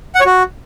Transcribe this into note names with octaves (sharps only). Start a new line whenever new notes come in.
F#5
C#5
F#4